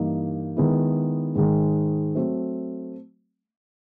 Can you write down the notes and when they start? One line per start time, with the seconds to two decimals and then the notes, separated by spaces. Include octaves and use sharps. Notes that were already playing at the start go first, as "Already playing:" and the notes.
Already playing: G2 E3 G3 A#3 D#4
0.57 D#3 G#3 B3 E4
1.35 G#2 D#3 G#3
2.15 F#3 A3 C4